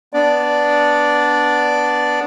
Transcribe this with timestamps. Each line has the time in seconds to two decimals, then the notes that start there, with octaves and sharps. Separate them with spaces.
0.13 B3 D4 D5